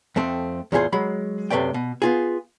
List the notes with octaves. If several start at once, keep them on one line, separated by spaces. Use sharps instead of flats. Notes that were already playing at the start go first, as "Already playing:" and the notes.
F2 A3 C4
E2 A2 F4 G4 G#4 C5
F#3 G#3 B5
F#2 C3 A3 B4 D5 G5
B2
B3 F4 G#4